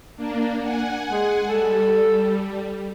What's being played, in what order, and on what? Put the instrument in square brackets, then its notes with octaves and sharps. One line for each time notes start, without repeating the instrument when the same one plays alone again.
[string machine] A#3 D4
F#5 G#5
[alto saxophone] G#3
[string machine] G3 [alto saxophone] A4